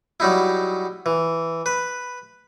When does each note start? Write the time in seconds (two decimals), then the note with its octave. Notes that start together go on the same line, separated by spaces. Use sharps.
0.20 F#3 G3 D#4 E4
1.06 E3
1.66 B4